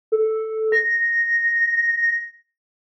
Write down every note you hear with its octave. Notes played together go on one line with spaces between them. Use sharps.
A4
A#6